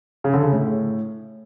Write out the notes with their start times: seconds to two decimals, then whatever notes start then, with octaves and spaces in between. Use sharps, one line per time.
0.24 C#3
0.33 D3
0.43 C#3
0.52 A2